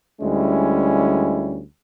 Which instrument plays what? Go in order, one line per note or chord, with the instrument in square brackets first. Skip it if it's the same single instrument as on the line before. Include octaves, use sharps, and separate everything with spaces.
[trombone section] D2 G3 G#3 C#4 E4